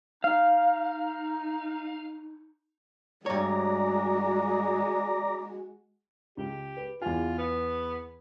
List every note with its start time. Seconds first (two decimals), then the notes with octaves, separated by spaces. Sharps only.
0.24 D#4 F5
3.26 G2 G#3 F#4 C#5 D5 A#5
6.37 C#2 G4
6.77 B4
7.02 E2 F4 G#5
7.38 B3